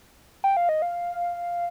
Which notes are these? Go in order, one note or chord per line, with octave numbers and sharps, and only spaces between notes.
G5
F5
D#5
F5